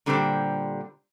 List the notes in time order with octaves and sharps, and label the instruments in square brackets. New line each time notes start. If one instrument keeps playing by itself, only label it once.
[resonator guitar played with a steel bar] A#2 D3 G3 C4 G4 C5